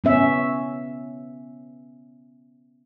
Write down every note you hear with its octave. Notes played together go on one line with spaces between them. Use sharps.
B3 C#4 E5